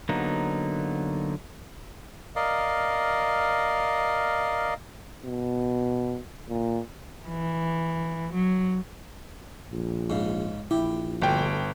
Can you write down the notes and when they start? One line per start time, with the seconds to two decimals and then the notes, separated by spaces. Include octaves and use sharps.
0.09 D3 F#3 A#3 B3 D#4
2.36 A#4 D5 D#5 F5
5.25 B2
6.49 A#2
7.27 E3
8.34 F#3
9.71 A#1
10.10 G#2 C#3
10.71 A#1 E4 G4
11.22 G1 D2 G5